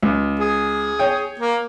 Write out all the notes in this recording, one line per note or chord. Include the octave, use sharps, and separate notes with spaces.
C#2
G#4
C#5 G5
A#3